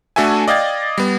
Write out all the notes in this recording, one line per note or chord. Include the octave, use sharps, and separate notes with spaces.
A3 D4 F#4 A4 E5 G#5
D5 D#5 F5 G5 G#6 A6
G3 B3